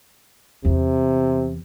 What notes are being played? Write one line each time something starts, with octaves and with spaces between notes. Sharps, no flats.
E2 C3